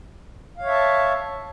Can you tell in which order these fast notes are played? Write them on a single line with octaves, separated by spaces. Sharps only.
F5 C#5 E5 A5